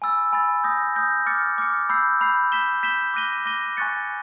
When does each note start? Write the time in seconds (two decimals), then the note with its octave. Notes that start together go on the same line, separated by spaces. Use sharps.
0.02 G#5 B5 E6 A6
0.33 G#5 B5 E6 A6
0.64 D#6 G6 A#6
0.95 D#6 G6 A#6
1.26 D6 F6 A6 C#7
1.58 D6 F6 A6 C#7
1.89 B5 E6 G6 C7
2.21 B5 E6 G6 C7
2.52 G6 B6 E7 G7
2.83 G6 B6 E7 G7
3.14 D6 F#6 A#6 D#7 G7
3.45 D6 F#6 A#6 D#7 G7
3.77 G#5 C#6 F#6 A6 C#7